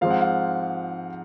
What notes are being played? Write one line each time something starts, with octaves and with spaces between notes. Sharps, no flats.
G#2 F3 G#3 C4 F5
F#5
F5